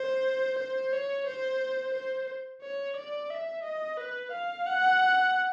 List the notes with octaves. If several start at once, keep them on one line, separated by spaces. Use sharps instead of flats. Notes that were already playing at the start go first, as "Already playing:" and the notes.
Already playing: C5
C5
C#5
C5
C5
C#5
D5
E5
D#5
B4
F5
F#5